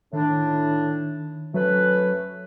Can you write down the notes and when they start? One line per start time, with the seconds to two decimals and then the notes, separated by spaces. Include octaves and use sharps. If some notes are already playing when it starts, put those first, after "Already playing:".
0.13 A2 D#3 D4
1.54 F#3 A3 C#4 B4